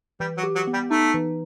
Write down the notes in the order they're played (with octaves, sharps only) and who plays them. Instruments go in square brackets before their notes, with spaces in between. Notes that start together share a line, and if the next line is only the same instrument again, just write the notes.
[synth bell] E3 [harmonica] G3
[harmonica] F#3
[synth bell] G4
[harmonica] F#3
[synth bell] B3
[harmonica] G3
[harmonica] A3 [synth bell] D#4
[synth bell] E3